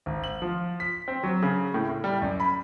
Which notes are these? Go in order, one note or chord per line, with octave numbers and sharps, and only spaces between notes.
G#1
F#7
F3
B6
C4
F#3
C#3
A2
A2
G3
F#2
B5